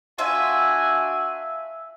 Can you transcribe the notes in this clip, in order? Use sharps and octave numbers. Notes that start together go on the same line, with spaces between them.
D4 F4 F#4 E5 G#5